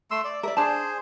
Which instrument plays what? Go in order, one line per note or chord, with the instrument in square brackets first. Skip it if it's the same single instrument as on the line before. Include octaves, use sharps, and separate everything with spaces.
[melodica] A3 C6 E6
D5
[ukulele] A#4 D5 [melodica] E5
[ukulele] D4 D5 A5 [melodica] G#4 C5